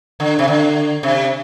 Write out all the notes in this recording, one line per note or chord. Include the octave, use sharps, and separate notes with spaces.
D3
C3
D3
C3